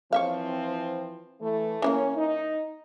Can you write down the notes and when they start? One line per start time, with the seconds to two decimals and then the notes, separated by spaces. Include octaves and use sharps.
0.13 E3 F3 C4 C#5 E5 F5
1.41 E3 A3
1.82 E3 G3 A#3 C#4
2.17 D#4